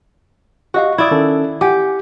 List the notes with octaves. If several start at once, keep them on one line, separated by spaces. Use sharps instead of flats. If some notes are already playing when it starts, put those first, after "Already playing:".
F#4 G4 D#5 F5
E4 D5 D#6 G#6
D#3 C#4 A4
G4 F#5 G#5 D6